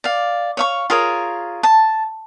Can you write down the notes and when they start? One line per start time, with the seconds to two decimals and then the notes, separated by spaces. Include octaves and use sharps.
0.04 D5 F5
0.57 C#5 F5 C#6
0.90 F4 G#4 A#4 C#5
1.63 A5